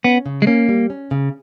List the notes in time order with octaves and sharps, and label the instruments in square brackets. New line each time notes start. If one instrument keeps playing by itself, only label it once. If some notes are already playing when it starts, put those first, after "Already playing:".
[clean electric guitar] B3 [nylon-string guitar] C#4
[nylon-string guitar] C#3
[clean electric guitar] G#3
[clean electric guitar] A#3 [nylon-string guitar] C#4
[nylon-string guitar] G3
C#4
C#3